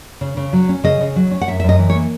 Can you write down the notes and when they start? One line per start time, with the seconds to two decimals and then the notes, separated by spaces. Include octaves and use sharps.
0.21 C#3
0.37 C#3
0.53 F#3
0.69 C#4
0.84 C#3 D#5
1.01 C#3
1.16 F#3
1.31 C#4
1.41 F#5
1.48 F#2 E5
1.60 E5
1.64 F#2 D#5
1.79 E3
1.90 C#5
1.95 A#3